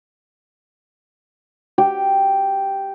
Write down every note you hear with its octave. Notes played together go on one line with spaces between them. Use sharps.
G4